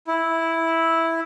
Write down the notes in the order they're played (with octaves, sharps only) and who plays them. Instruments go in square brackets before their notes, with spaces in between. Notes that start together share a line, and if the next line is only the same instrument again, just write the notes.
[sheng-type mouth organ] E4